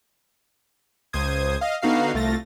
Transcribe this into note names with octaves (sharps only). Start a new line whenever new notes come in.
C#2 C5 D#6 G#6
D#5 F5
D3 B3 D#4 F#4 F5 C7
C2 A3 F4 A6 A#6